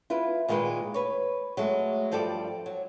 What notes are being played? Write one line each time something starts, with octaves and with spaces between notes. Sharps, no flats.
E4 F4 B4
A#2 D#3 G#3 F4 B4
B4 C#5
F#3 G#3 A3
G2 F3 G3 A4 D5
F#3